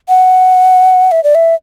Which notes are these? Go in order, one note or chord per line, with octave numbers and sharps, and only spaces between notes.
F#5
E5
D5
E5